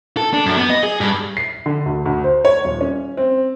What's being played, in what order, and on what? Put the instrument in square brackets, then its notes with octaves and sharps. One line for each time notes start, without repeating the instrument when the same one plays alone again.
[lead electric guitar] A4
D4
F#2
B3
D#5
G#4
G2
[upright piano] C7
D3
D2
D2
C5
C#5
D#1
C#4
C4